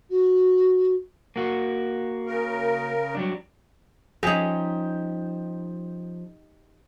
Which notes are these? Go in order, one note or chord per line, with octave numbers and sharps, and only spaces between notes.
F#4
A#3 F#4
C#3 A#4
F#3 G3 D4
F3 G3 C#4 D#4 G4 G#4